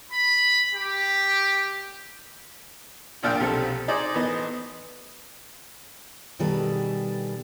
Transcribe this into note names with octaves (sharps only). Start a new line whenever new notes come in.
B5
G4
A#1 A#2 D4 F5 G5
B1 C3 F3 A4
D#4 G#4 C5 D5
A1 B3 D#5
B2 D#3 G3 G#4 A4 B4